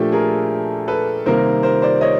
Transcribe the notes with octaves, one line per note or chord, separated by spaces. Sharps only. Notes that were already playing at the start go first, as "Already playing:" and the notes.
Already playing: A#2 F3 A3 D4 G4 A4
G#4 A#4
A4 B4
C3 D#3 G3 A#3 A#4 C5
A#4 C5
C5 D5
C#5 D#5